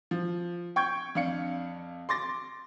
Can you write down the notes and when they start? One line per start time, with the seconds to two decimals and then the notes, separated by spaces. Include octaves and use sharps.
0.11 F3
0.76 G5 C#6 G6 G#6
1.15 F2 D4 F5 C#7
2.09 C6 D6 A6 A#6